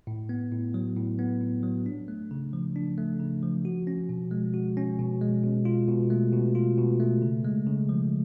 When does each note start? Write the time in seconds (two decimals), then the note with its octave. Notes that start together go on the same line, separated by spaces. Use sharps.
0.07 A2
0.29 B3
0.52 A2
0.74 F#3
0.97 A2
1.19 B3
1.41 A2
1.63 F#3
1.86 D4
2.08 A3
2.31 C#3
2.53 F3
2.76 D4
2.98 A3
3.20 C#3
3.43 F3
3.65 F#4
3.87 C#4
4.09 B2
4.31 G#3
4.54 F#4
4.77 C#4
4.99 B2
5.21 G#3
5.44 B2
5.65 F4
5.88 B2
6.10 A3
6.33 B2
6.55 F4
6.78 B2
7.00 A3
7.22 C#3
7.45 G#3
7.67 C#3
7.89 F3